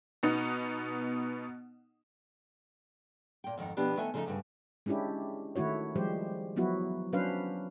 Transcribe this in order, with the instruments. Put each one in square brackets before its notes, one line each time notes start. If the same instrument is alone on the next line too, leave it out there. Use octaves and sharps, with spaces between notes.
[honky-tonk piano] B2 B3 D#4
[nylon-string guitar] A#2 G5
F2 G#2 D#3
B2 F3 B3 D4 G4
D#3 A3 B3 E5 G#5
C#3 F3 A3 C#4 D#4
D2 G2 C#3
[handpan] G#3 C#4 D4 E4 G4
D#3 A3 E4 F#4 C#5
F3 G3 G#3 G4 C5
F3 F#3 B3 E4 F#4
F#3 C#4 D4 B4 C5 F5